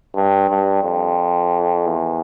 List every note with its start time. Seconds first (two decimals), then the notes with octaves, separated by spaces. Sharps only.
0.15 G2
0.50 G2
0.84 F2
1.86 E2